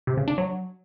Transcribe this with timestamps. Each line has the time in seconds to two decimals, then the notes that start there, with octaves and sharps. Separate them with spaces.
0.07 C3
0.17 C#3
0.28 D4
0.38 F#3